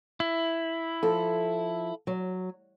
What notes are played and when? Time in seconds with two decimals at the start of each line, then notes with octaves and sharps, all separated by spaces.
0.20 E4
1.03 F3 A4
2.07 F#3